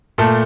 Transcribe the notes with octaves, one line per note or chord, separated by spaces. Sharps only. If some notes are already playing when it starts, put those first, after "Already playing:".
A#2 A3 A4